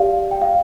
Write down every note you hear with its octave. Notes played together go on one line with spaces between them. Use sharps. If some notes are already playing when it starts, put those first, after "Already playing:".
Already playing: G4 D5 F5
G5
F5